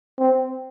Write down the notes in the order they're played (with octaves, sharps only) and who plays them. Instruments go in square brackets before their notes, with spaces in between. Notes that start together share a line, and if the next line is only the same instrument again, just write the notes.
[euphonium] C4